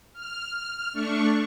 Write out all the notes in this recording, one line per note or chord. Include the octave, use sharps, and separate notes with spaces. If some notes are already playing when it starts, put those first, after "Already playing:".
F6
A3 D4 C#6